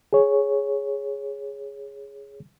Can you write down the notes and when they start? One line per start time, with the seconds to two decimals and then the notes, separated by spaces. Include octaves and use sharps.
0.13 G#4 C#5